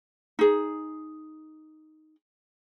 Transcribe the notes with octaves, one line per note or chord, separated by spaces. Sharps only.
D#4 G#4